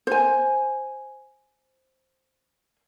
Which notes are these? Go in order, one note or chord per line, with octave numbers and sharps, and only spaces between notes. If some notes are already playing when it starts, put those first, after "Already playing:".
C5 G#5